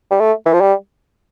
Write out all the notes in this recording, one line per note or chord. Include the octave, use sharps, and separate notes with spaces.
G3
A3
E3
F3
G3